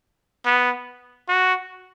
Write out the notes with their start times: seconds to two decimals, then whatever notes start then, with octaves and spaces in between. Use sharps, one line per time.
0.46 B3
1.28 F#4